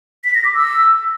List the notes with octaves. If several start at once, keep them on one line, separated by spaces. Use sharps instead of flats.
B6
A#6
D6
E6